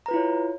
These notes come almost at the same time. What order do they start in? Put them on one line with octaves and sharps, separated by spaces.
A#5 B4 F4 E4 C#5